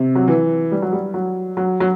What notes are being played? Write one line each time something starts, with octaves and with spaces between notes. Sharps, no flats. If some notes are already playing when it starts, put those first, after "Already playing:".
Already playing: C3
F#3
E3
G3
F#3
G3
F#3
F#3
F#3